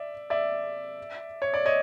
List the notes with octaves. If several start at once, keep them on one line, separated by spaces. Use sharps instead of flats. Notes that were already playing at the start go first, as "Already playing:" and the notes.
Already playing: D5 E5
D5 E5
C#5
D5
C#5 D#5